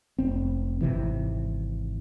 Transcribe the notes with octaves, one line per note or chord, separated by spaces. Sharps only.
F1 C4
G#1 C#2 C3 E3